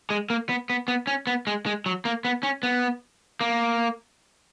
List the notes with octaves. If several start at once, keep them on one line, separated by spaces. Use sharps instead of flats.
G#3
A#3
B3
B3
B3
C#4
B3
G#3
G#3
F#3
A#3
B3
C#4
B3
A#3